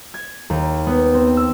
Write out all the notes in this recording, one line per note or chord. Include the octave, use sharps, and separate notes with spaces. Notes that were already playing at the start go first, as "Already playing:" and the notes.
G#6
D#2
B3
C4
E6